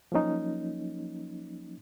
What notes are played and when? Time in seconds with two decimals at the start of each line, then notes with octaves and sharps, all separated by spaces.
0.12 F3 F#3 A#3 C#4 D#4